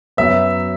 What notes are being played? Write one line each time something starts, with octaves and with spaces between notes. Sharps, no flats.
F#2 F#3 B3 E5